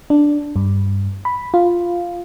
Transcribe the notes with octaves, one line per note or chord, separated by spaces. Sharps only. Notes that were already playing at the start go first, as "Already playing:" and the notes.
D4
G2
B5
F4